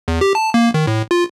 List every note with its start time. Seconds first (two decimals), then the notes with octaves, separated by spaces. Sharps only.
0.08 E2
0.21 G4
0.35 A5
0.54 A#3
0.74 D#3
0.87 A2
1.11 F4